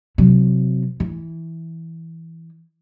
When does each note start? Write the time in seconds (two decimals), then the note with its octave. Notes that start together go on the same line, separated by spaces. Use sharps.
0.18 C3 F#3
1.00 E3